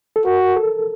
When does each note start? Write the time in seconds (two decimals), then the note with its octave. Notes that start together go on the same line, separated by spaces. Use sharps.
0.16 A4
0.25 F#4 A#4
0.56 A4